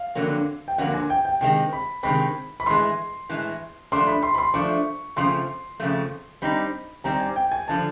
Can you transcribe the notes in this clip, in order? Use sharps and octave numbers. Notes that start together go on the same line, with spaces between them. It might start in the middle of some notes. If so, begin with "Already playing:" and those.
Already playing: F5
F2 D3 F#3 A#3
G5
F2 D3 F#3 A#3 F#5
G#5
G5
G5
C3 D#3 G#3 C4 G5
B5
C3 D#3 G#3 C4 B5
B5
A2 E3 G#3 C6
A2 E3 G#3
F3 A3 D4 C6
B5
C6
B5
C6
F3 A3 D4 C#6
F2 C#3 F3 A3 C6
F2 C#3 F3 A3
G3 C4 D#4 B5
G3 C4 D#4 A#5
G#5
G5
G#5
D3 F3 A5